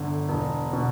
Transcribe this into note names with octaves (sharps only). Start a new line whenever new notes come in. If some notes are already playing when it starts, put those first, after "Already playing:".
Already playing: G1 D3
E1
B2